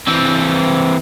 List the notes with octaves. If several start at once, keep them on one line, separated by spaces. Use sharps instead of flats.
E3 C4